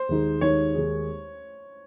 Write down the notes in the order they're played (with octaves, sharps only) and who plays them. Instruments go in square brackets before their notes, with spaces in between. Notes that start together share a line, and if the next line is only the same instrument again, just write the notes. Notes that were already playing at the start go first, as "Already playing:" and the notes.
Already playing: [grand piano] C5
[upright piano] D#2 D#3 G#3 D#4 G#4
[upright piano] D#2 D#3 G#3 D#4 G#4 [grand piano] C#5
[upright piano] D#2 D#3 G#3 D#4 G#4